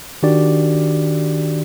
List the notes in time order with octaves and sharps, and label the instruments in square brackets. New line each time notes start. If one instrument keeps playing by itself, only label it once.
[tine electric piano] D#3 D4 F#4 G4 D5